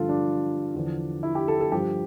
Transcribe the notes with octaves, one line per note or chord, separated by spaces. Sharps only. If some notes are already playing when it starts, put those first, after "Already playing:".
Already playing: G2 D3 F3 F4 A4
D4
E2 D3 F3
E4
G4
A4
A4
G2 F3 G4